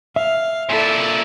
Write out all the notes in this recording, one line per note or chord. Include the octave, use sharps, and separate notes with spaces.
E5 F5
A#2 E4 A4 D5